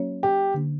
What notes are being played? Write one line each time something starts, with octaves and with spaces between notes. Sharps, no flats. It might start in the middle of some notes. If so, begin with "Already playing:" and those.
Already playing: F#3 A#3 C#4 F#4 C#5
G4
D3 A#3 D4